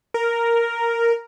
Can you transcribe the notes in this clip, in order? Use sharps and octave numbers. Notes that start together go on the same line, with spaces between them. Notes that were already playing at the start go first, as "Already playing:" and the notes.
A#4